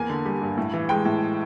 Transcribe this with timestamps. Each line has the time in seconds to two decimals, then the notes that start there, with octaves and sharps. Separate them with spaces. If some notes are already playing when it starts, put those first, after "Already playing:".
Already playing: E2 A#3 G#5
0.09 D3
0.25 G3
0.41 G2
0.57 A2
0.73 E3
0.89 G#3 G5
1.05 A2